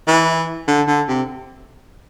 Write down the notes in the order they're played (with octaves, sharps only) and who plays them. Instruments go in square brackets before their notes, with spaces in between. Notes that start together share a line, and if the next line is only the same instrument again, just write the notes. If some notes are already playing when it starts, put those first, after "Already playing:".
[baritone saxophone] E3
D3
D3
C3